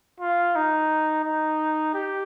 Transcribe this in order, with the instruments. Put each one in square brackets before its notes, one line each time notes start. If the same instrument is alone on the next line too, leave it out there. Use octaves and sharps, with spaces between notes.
[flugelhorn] F4
D#4
D#4
G4